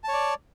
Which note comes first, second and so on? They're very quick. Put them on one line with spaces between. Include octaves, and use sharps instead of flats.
A5 C#5 D5